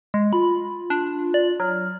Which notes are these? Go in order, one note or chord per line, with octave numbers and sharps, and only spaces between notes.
G#3
F4 B5
D4
D5
F#3 F6